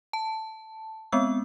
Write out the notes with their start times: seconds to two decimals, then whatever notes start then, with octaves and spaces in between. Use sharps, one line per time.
0.13 A5
1.12 G#3 B3 C4 E6